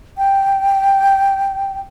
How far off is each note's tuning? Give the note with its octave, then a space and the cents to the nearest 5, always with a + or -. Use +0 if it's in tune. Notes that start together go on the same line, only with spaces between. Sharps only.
G5 +0